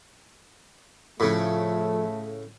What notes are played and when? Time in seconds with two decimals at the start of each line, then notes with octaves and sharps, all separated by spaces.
1.20 A2 C#3 F3 A3